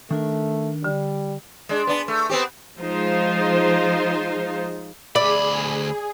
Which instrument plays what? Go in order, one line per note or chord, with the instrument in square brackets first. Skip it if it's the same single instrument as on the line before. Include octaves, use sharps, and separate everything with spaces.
[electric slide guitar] D#3 D4 A#4 [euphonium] A3
[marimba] D3 [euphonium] G3
[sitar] G#3 D4
B3 D4
A3
B3 C4 G4
[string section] F3 G#3 D#4 F4 C5
[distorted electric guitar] D2 B5 [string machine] G#4 [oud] D5